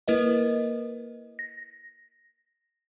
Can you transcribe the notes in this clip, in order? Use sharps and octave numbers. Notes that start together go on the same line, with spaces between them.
A#3 E4 A#4 B4 D#5
A#6